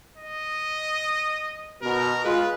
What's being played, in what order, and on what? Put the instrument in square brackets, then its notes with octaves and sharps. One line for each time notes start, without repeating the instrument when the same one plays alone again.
[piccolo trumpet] D#5
[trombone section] B2 [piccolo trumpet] A#4
[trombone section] G#3 F4 [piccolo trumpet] B4